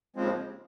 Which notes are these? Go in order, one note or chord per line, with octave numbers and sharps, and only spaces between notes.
D#2 C#3 F3 G#3 C4